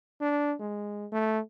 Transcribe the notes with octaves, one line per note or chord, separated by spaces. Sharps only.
D4
G#3
A3